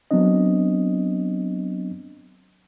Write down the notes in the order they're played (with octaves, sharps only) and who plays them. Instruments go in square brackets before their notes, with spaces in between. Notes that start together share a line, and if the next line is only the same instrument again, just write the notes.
[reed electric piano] F#3 B3 C4 D4 D#5